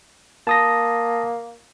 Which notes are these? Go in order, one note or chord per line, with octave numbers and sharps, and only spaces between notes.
A#3 A5 D#6 A#6